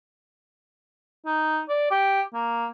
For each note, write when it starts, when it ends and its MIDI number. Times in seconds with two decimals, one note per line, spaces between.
1.26 1.60 63
1.69 1.89 74
1.91 2.22 67
2.34 2.67 58